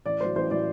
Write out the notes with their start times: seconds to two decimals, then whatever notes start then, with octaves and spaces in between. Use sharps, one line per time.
0.05 A1 D5
0.20 A2 F#3 C5
0.35 A1 C5
0.51 A2 F#3 D5